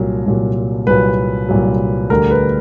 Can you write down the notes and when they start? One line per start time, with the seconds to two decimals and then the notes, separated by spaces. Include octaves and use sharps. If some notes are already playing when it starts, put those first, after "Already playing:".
Already playing: C2 A#2 F#3
0.26 C2 A#2 F#3
0.87 C2 A#2 F#3 B4
1.48 C2 A#2 F#3
2.10 D2 D3 G3 A#4
2.31 B4